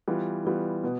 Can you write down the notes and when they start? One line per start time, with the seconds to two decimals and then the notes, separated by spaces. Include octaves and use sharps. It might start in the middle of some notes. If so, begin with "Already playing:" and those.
0.08 E3 G3 B3 F4
0.45 E3 G3 B3 F4
0.84 B2 B3